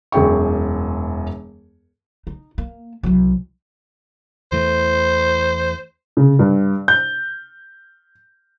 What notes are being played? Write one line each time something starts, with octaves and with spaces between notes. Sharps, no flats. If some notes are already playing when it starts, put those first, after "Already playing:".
E1 F#2 G#4 G5 C#6
D#4
A#3
C2 F#3
E2 E3 A3 C5
C#3
G2
G6